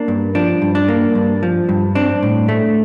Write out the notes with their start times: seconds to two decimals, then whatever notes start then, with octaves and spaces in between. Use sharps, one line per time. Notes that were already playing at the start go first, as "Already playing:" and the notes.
Already playing: A#3 D4
0.08 G2
0.35 F3 D4
0.62 G2
0.75 D4
0.88 A#3
1.15 G2
1.43 F3
1.69 G2
1.95 C4 D4
2.23 A2
2.48 A3